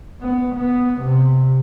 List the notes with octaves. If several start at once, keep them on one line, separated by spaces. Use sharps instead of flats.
B3
B3
C3